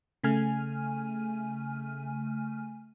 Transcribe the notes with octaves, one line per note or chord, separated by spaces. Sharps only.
C#3 A3 G#5 F6